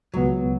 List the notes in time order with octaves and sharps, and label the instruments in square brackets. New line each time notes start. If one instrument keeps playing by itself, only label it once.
[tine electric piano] C#2 B2 B3 [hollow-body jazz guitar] F#3